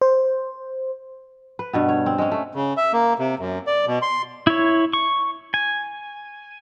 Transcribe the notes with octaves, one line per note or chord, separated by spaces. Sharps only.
C5
B4
G2 B2 B3
C#5
C4
G#3 C#4
A3
C#3
E5
A#3
C3
F#2
D5
B2
C6
E4 C#5
C#6
G#5